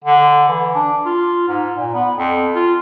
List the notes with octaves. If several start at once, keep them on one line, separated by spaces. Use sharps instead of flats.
D3
E3
D4
F4
G#2
A#2
B3
F2
F4